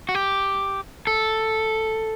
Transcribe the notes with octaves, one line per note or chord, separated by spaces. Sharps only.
F#4
G4
A4